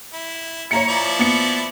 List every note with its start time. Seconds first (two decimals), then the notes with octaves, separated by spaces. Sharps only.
0.13 E4
0.71 E4 C#5 A#5 C#7
0.88 F3 E4 D5
1.19 B3 C#7